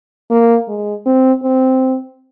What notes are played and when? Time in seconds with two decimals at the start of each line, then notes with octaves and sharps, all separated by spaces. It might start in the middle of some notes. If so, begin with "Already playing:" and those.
0.31 A#3
0.68 G#3
1.06 C4
1.44 C4